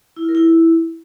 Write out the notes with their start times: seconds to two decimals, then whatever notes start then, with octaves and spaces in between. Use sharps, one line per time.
0.16 E4
0.23 F4
0.29 A#4
0.35 E4